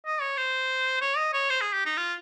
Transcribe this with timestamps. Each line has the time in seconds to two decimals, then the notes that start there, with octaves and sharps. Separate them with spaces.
0.06 D#5
0.21 C#5
0.37 C5
1.01 C#5
1.17 D#5
1.33 C#5
1.50 C5
1.61 G#4
1.73 G4
1.85 D#4
1.97 F4